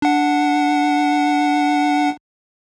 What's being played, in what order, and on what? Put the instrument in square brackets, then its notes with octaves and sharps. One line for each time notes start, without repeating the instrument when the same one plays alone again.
[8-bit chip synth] D4 F#5